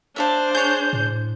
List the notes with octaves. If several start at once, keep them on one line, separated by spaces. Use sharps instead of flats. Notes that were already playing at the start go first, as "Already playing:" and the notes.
D4 C5 E5 F5 A5
G#4 C#5 G6
A2